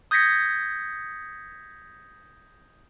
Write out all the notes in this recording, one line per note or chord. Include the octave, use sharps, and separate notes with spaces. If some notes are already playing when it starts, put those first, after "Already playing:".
D#6 G6 G#6 A#6 B6 C#7